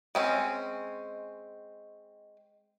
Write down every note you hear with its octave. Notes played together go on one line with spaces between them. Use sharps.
G#3 C4 C#4